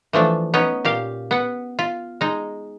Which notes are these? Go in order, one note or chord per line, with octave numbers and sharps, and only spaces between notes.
E3 F3 A3 D4
B3 C#4 D#4
A#2 G4 F5
B3 F#5
F4
G#3 D#4